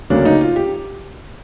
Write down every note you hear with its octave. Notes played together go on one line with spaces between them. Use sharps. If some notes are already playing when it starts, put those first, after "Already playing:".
D2 C#3 F#3 A#3 D4
D#4
F4
G4